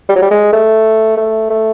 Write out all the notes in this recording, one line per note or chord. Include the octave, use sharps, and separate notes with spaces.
G3
F#3
G3
G#3
A3
A3
A3